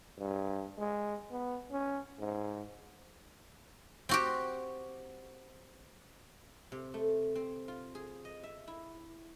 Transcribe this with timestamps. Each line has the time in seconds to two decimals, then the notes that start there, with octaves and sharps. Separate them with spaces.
0.19 G2
0.78 G#3
1.31 B3
1.71 C#4
2.20 G#2
4.09 C4 F#4 G4
6.72 C3
6.94 A3
7.35 C4
7.68 F4
7.95 G#4
8.25 D#5
8.43 E5
8.67 E4